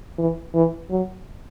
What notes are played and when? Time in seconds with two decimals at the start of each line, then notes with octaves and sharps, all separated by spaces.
0.18 E3
0.54 E3
0.90 F#3